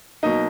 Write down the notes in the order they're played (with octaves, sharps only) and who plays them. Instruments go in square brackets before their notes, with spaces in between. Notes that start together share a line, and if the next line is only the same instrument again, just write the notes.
[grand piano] B2 F#3 A#3 D#4